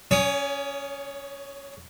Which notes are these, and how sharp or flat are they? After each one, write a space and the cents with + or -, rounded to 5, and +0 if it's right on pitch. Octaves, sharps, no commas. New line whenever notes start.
C#4 +0 C#5 +40 D#6 +0